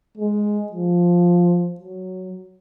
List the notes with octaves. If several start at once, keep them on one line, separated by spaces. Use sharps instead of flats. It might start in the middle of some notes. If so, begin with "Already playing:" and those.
G#3
F3
F#3